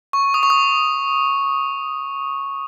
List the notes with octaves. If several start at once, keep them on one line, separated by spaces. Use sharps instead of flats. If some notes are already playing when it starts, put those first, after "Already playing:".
C#6
D#6
C#6
D#6